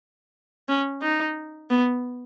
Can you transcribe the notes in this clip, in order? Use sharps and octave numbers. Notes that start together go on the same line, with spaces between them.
C#4
D#4
B3